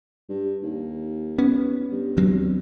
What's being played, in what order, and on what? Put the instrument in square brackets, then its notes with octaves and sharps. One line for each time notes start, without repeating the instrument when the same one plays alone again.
[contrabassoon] G2
D#2
[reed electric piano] B3 [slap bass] C#4
[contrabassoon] G2
[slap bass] D2 F#3 C4